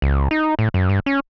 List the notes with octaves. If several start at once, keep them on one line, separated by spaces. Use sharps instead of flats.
C#2
D#4
A2
F#2
G2
C#4